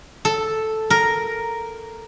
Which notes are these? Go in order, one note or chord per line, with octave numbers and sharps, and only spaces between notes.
A4
A#4